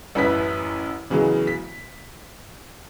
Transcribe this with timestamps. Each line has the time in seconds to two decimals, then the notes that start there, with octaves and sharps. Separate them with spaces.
0.15 A1 F#2 E4 B4 B6
1.10 C#3 E3 F#3 G#3 B3
1.47 B6